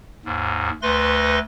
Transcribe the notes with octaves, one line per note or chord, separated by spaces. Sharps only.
D#2 G#2
D2 A3 B4 C6 A#6